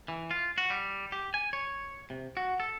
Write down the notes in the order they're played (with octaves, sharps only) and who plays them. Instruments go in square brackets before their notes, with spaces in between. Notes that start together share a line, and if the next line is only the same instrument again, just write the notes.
[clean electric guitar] E3
F4
F#4
G3
G4
G#5
C#5
C3
F#4
A4